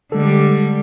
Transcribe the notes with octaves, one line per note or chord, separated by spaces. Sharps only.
D3 G3 G#3 A4